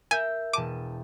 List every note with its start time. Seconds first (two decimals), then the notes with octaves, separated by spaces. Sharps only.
0.11 A#4 E5 G#5 G6
0.53 E1 A5 D6 D#7